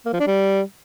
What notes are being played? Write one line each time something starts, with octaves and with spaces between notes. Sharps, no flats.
A#3
F3
D4
G3